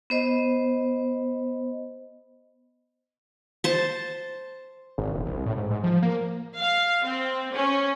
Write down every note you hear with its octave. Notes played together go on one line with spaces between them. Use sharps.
B3 C5 D#5
C5 A5
G#1
E1
C2
A2
G#2
G#2
F3
A#3
F5
C4
C#4